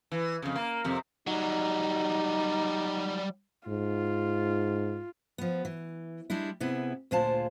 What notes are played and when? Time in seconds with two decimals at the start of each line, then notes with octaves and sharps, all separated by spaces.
0.12 E3
0.42 F2 C#3
0.56 A#3
0.84 F2 C3
1.27 F#3 G3 D#4
3.68 G#2 F4
5.38 F3 B3
5.65 E3
6.30 G3 G#3 D4 E4
6.60 C3 B3 E4 G#4
7.11 D2 A#2 G#3 F4 C5 A5